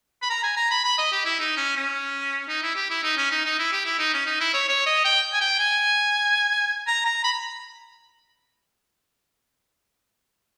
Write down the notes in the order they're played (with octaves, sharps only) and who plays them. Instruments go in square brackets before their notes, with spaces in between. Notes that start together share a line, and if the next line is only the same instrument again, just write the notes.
[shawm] B5
A#5
G#5
A#5
B5
B5
D#5
G4
E4
D#4
C#4
C#4
D#4
E4
G4
E4
D#4
C#4
D#4
D#4
E4
G4
E4
D#4
C#4
D#4
E4
C#5
C#5
D#5
G5
G#5
G5
G#5
A#5
A#5
B5